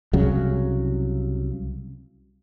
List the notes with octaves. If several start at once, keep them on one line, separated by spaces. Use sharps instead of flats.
C2 C#3 F#3